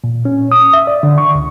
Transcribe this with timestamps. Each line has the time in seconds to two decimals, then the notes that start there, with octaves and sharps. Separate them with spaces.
0.04 A#2
0.25 C#4
0.52 D#6
0.73 E5
0.87 D5
1.03 D3
1.18 C#6
1.35 C#2